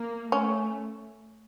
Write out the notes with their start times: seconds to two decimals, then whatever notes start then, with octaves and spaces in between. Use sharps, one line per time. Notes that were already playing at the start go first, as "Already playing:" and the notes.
Already playing: A#3
0.32 A3 C#4